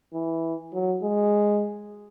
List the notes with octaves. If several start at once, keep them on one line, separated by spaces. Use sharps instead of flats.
E3
F#3
G#3